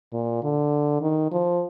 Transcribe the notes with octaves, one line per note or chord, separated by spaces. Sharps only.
A#2
D3
D#3
F3